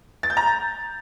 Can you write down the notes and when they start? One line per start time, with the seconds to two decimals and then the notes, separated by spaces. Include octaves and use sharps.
0.23 A6
0.30 G6
0.37 A#5